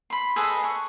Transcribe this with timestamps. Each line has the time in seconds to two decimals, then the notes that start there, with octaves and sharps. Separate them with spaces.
0.10 B5 C6
0.36 G#4 A4 B4 D#5
0.64 C#6